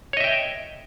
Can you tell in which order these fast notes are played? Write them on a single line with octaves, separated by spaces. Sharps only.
C#5 D#5 E5 G5